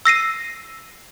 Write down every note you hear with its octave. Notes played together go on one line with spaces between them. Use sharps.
E6 A#6 C7 D#7